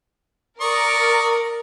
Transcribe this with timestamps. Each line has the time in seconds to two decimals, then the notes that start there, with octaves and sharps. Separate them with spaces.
0.61 A#4 D5 C#6 D#6